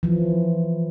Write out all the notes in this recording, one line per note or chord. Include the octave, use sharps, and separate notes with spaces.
E3 F3